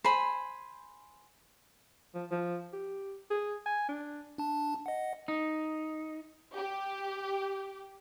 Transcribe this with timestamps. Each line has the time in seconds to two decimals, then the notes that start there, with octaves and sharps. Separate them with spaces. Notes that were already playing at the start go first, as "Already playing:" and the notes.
0.04 C5 G#5 B5
2.14 F3
2.31 F3
2.73 G4
3.30 G#4
3.66 G#5
3.89 D4
4.38 D4 A5
4.86 D#5 F#5
5.28 D#4
6.55 G4